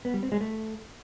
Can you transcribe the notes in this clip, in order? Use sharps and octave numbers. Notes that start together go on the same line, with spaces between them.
B3
G3
C4
G#3
A3